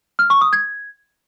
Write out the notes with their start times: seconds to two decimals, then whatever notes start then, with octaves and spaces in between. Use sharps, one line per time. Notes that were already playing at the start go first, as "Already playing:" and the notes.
0.19 F6
0.30 C#6
0.41 D#6
0.53 G#6